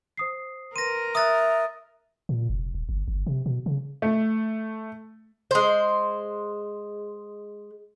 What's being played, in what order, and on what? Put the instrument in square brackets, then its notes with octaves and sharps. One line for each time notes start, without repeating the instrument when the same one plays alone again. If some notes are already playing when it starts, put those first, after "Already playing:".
[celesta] C5 D#6 C7
[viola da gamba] A#4 [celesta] B4 C6 [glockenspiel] A#6 D#7
[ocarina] E5 [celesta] A#5 E6 F#6 [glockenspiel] D#6 A6
[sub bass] A#2
F1
D#1
G1
G1
C3
B2
C#3
[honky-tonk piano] A3
[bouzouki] G#3 C5